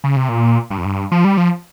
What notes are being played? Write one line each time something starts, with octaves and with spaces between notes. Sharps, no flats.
C#3
C3
A#2
G2
F2
G2
F3
G3
F3